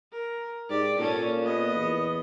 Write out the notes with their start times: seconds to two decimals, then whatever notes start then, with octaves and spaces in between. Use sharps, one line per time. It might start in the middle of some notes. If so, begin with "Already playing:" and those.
0.12 A#4
0.70 G#2 G4 D5
0.99 A#2 C#4 A4
1.43 B3 D#5
1.75 E2